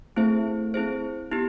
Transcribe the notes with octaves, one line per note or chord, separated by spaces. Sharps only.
A3 C4 E4 G#4 C5
C4 E4 G#4 C5
B3 E4 G4